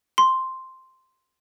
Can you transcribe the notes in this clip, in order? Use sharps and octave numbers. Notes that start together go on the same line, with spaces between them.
C6